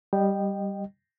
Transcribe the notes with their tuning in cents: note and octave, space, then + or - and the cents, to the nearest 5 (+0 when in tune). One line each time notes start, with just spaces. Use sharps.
G3 +0 D#5 -20 G5 +0